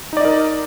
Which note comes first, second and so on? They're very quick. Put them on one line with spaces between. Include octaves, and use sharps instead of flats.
D#4 D5 D#5 A#4